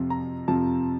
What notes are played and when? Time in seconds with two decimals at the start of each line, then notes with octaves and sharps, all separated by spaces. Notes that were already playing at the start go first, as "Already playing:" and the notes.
Already playing: F2 C3 F3
0.10 A#5
0.48 F2 C3 F3 A5